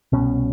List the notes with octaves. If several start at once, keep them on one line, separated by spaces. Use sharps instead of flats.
C2 B2 C#4